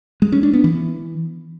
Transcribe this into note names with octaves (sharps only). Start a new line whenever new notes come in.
G#3
C#4
D4
B3
E3